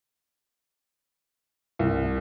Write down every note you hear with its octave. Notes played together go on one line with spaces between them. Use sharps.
C2